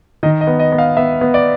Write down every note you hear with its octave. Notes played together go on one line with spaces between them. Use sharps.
D#3 D#5
D#5
B3
D#5
B3
F5
B3 E5
B3
D5